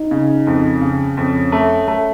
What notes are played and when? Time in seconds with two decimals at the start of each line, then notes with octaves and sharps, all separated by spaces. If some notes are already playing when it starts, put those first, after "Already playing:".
Already playing: D#4
0.11 C#3
0.47 F2
0.81 C#3
1.17 F2 C#4
1.52 A3
1.88 A3